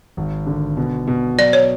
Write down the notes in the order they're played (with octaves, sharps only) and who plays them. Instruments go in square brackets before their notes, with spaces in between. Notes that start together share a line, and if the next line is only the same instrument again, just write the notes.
[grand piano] G#1
D3
B2
B2
[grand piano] F#3 [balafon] D5
[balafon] C#5